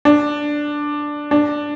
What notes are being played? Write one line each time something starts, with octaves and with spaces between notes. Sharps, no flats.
D4
D4